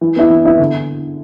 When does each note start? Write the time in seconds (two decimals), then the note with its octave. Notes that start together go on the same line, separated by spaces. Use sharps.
0.01 E3
0.16 B3 E4
0.30 E3
0.45 B3 E4
0.59 D3